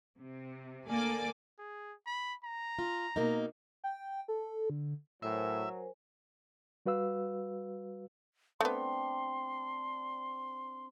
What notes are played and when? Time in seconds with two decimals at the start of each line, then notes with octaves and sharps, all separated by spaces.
0.19 C3
0.89 D2 A#3 A4 D5 G#5 D6
1.59 G#4
2.06 B5
2.44 A#5
2.79 F4
3.16 B2 A#3 D#4
3.84 G5
4.28 A4
4.70 D3
5.22 A2 F#3 A#4 C5 E5 G#5
6.86 G3 F#4 B4 F5 E6
8.61 A3 B3 C4 D4 C6